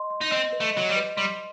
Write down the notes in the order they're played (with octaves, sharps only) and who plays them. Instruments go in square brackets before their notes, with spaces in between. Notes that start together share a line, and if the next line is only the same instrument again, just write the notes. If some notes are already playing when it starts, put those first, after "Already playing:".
Already playing: [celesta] D#5 C6
C6
[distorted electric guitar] D#4
[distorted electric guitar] C4 [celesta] D#5
[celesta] B4
[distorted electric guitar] A3
[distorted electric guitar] F#3 [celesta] D#5
[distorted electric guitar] G3
[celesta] B4
[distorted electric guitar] G3 [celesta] C6